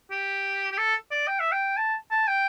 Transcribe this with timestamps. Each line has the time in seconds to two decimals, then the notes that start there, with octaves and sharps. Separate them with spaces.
0.11 G4
0.71 G4
0.78 A4
1.11 D5
1.27 G5
1.40 E5
1.52 G5
1.77 A5
2.11 A5
2.28 G5